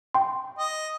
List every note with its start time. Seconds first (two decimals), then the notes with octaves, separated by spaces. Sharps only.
0.14 G5 C6
0.59 D#5